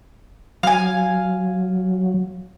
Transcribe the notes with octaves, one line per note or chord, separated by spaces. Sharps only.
F#3 F5 G#5